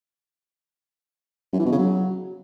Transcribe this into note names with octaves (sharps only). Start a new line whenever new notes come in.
F#2
E3
B2
C#3
F#3